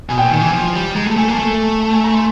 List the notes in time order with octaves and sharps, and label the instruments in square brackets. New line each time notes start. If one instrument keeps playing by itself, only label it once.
[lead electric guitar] B2 [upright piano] G#5
[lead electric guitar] A#2 [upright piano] G5
[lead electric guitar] D#3 [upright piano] G#5
[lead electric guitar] E3
F3
G3
[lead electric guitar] G#3 [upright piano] A#5
[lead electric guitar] A3 [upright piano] A5
[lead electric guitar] A3 [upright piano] G#5
[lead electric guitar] A#3 [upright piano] A5
[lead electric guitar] A3
[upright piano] A5
G#5
A#5
C6